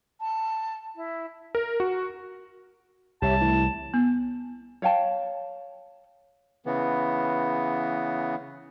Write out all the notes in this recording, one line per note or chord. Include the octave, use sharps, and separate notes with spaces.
A5
E4
A#4
F#4
C2 G4 C#5 E5 A5
E3 A3
B3
C#5 F5 G5 A5
C#3 E3 B3